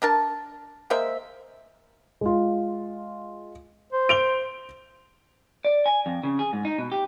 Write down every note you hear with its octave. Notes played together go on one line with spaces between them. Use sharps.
D4 A#4 A5
G#3 A#3 C5 E5
G#3 F4
C5
D7 F7 G7
D5
G#5
F2
C#3
G#4
G#2
D#4
B2
G4